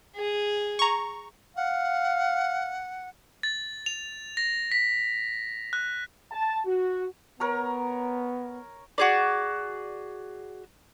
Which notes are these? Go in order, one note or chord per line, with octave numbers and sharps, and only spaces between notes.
G#4
A#5 C#6
F5 F#5
A6
F7
A#6
B6
F#6
A5
F#4
B3 A#4 C#5 A#5
F#4 G#4 D5